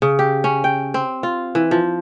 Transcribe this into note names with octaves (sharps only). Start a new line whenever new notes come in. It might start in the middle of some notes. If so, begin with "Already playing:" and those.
C#3
G4
C#4
G5
C4
F4
E3
F3